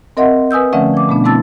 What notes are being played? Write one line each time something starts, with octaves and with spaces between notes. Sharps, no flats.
C4 A#4 D#5 E5 F#5 C6
B4 G#5 D#6 E6 G6
D3 F3 A3 C#4 E5 F#5
F3 D6
B2 A3 B3 D4
A3 C4 E4 A5 E6 A6